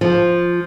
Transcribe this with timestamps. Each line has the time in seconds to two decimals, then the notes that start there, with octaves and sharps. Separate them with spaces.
0.01 F3